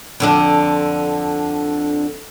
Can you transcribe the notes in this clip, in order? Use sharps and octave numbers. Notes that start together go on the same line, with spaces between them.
F2 D3 D4